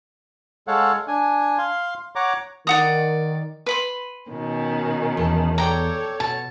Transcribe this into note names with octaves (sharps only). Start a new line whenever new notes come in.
G#3 A4 C#5 F5 F#5
D4 G#5
F5 C6
C#5 F#5 A#5 D6
D#3 D5 F#5 D#6
B4 B5 C6
B2 D#3 C#4
E2 A5
A4 C#5 D5 G5 A#5
B2 A5